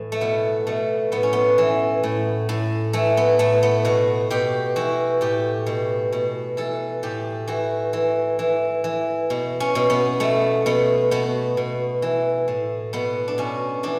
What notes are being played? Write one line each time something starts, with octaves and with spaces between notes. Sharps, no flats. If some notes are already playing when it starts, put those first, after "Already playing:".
Already playing: A2 E3
A3
B2 B3
B2 A3
A2 B3
C#4
B3
E3
A2
A2
E3 A3
B3
A2 A3
B3
B2 F#4
B2 G4
E3 F#4
A2 G4
B2
B2
E3 A4
A2 G4
E3 F#4
E3
E3
E3
B2
C#4
B2
B3
B2 A3
B2 B3
B2 B3
B2
E3
A2
B2 B3
D4
B2 C#4
E3 D4